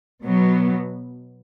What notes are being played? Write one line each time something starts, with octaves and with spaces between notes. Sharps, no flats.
B2 F#3 B3